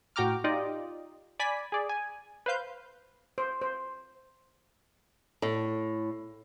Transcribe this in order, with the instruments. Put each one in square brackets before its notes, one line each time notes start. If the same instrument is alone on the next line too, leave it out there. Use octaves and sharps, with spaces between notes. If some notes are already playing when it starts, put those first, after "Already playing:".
[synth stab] A2 F#4 G5 A#5 D6 F6
D#4 F4 G4 D5 D#5
D5 G#5 B5 B6
G#4 D5
G#5
B4 C5 F5 G6
[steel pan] C5
C5
[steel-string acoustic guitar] A2